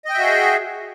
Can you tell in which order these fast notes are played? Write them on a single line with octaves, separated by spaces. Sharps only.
D#5 G5 E5 F#4 G#4